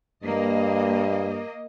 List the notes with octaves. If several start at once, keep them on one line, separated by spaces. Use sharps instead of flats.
G2 A#3 D#5